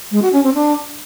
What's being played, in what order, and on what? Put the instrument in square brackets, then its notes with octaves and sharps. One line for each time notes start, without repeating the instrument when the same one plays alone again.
[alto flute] G#3
F#4
C#4
C4
D4